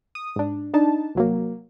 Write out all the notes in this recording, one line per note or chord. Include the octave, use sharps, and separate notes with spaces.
D#6
G#2 D4
D4 D#4 A5
C2 F#3 A#3